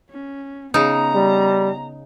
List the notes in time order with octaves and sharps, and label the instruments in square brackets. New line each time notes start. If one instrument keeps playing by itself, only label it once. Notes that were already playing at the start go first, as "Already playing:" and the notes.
[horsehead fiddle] C#4
[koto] C#3 D#4 [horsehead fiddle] B3 A#5
[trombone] G3